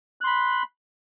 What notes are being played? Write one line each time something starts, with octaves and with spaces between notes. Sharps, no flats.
B5 C6 F#6